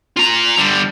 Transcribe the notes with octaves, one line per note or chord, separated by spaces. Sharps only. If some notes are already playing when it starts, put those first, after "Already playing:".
F4 A#5
D3 G3